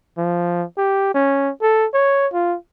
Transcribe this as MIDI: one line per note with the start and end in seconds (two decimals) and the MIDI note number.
0.18 0.64 53
0.78 1.10 67
1.15 1.51 61
1.62 1.86 69
1.94 2.28 73
2.33 2.56 65